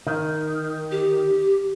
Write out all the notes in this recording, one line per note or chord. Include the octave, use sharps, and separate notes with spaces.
D#3
G4